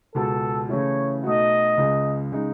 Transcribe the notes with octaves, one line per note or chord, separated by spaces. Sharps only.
C#2 B2 G#3 A4
C#3 E3 A3 C#4 E4 C#5
B2 A3 D#4 F#4 D#5
C#2 C#3 G#3
C#3 G#3 D#4